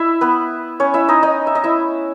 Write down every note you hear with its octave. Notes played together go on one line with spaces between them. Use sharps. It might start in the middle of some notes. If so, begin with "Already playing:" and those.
Already playing: E4 E5
B3 B4
C#4 C#5
E4 E5
D#4 D#5
D#4 D#5
E5
D#5
E4 E5